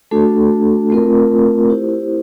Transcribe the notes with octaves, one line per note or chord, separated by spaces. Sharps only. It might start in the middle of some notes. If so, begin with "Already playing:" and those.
A3 D4 F#4 A4
A3 C4 F4 A#4
E4 G4 C5